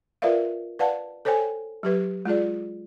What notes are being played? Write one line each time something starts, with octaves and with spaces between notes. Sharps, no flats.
F4 A#4 B4 D5 E5 F5
B4 D5 F5 F#5 A5
A4 C5 C#5 G5 G#5
F#3 G4 B4
G#3 F4 G#4 D5